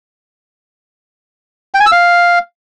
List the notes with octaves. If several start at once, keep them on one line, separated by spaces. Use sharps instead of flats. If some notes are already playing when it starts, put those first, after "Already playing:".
G5
G#5
E6
F5